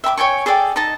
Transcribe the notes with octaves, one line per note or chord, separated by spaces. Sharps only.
E5 G5 B5 D6
C#5 G5 G#5 C#6
G#4 A4 D5 G5
D#4 D#5 A5